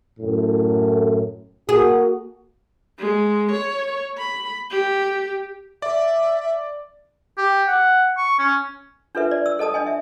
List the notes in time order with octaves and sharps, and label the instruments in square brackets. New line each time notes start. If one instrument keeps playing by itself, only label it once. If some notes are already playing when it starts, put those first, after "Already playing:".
[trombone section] F#2 A2
[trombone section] A#3 F#4 [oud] G#4
[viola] G#3
C#5
B5
G4
[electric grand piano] D5 [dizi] E5
[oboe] G4
F#5
C#6
C#4
[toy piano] D4 F4 A4 B4 E5
D5
E6
A4 D#5 A5 D#6
D4 D#5 G#5
E5